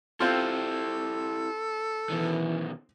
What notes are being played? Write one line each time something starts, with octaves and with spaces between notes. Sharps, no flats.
C4 E4 F4 G4 A4
B2 D#3 E3